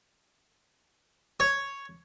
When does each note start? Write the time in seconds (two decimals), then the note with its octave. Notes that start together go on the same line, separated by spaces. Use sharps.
1.40 C#5